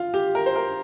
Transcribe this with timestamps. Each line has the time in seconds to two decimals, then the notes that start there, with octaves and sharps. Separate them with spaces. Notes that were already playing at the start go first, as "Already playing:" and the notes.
Already playing: F4
0.14 G4
0.35 A#4
0.46 C5
0.56 A#4